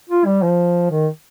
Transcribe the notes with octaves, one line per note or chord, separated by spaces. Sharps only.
F4
G3
F3
D#3